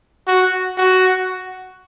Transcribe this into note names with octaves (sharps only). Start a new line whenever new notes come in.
F#4
F#4